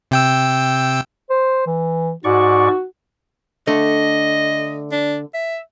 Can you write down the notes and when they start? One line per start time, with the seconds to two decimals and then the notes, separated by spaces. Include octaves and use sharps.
0.11 C3 G5 E6
1.30 C5
1.66 E3
2.24 G#2 F#4 D5 C#6
3.67 D3 A3 D#5
4.92 D4
5.34 E5